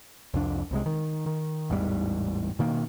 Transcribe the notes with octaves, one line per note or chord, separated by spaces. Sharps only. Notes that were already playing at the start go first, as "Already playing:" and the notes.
C2 F2 D4
C2 C3 G#3
D#3
D#3
A1 E2 G#2 G3
B2 D#3 A#3